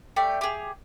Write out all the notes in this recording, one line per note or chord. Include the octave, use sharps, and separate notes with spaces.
A3 G4 D5
G4 G#4